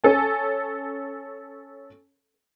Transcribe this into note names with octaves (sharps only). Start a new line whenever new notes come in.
C#4 A4 G#5